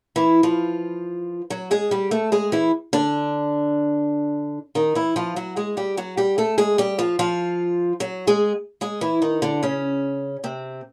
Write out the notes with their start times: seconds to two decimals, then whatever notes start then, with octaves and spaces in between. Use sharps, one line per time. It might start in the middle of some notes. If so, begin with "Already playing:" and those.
0.16 E3 E4
0.43 F3 F4
1.50 F#3 F#4
1.71 G#3 G#4
1.91 G3 G4
2.11 A3 A4
2.32 G#3 G#4
2.52 E3 E4
2.93 D3 D4
4.75 D#3 D#4
4.95 E3 E4
5.16 F3 F4
5.36 F#3 F#4
5.56 G#3 G#4
5.77 G3 G4
5.97 F#3 F#4
6.17 G3 G4
6.38 A3 A4
6.58 G#3 G#4
6.78 G3 G4
6.99 F3 F4
7.19 F3 F4
8.00 F#3 F#4
8.27 G#3 G#4
8.81 G#3 G#4
9.01 E3 E4
9.22 D#3 D#4
9.42 D3 D4
9.63 C#3 C#4
10.44 C3 C4